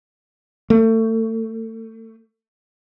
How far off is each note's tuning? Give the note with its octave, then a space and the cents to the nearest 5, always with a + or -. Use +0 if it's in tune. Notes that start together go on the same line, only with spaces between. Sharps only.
A3 +30